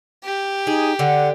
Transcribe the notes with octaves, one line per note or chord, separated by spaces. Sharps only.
G4
D#4 G#4
D3 F#5